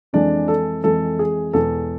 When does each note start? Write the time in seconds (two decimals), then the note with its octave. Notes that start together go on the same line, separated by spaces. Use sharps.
0.13 F2 E3 G#3 D4 D5
0.48 A4
0.83 F2 E3 G#3 A4
1.19 G#4
1.53 E2 B2 G#3 A4